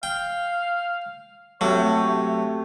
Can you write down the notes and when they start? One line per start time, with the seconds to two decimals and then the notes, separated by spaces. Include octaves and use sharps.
0.03 F5 G5
1.61 C3 F#3 A3 C#5